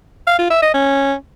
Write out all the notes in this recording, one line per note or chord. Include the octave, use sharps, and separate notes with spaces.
F5
F4
E5
D#5
C#4